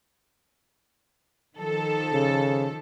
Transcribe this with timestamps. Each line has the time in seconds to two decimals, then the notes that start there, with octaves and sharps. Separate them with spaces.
1.58 D#3 F3 A4
2.13 C#3